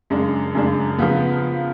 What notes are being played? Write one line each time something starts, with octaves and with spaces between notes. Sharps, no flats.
F#2 C#3 G#3 D4
F#2 C#3 G#3 D4
C#3 F3 B3